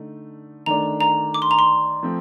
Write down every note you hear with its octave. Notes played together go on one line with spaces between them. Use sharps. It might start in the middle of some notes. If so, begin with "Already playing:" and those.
Already playing: D3 A3 D#4
D#3 A3 D4 A#5
A#5
D6
C6
A#5
C6
F3 A3 C4